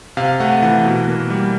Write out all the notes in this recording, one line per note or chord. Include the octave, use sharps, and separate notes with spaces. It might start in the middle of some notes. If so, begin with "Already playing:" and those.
C3 F5
A3 F#5
E3 F#5
B2
A#3
G3